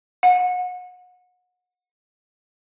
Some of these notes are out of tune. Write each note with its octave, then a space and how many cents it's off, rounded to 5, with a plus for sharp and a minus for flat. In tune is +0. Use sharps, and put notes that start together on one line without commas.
F#5 -35